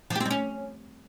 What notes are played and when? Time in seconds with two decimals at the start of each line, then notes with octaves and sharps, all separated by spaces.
0.10 F3
0.15 G4
0.20 C4
0.25 G3
0.31 C#4